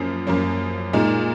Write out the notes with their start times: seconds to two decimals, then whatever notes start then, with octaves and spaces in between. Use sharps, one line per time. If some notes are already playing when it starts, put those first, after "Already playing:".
Already playing: F#2 F3 A#3 C#4
0.27 F#2 F3 A#3 C#4
0.93 A#2 G#3 D#4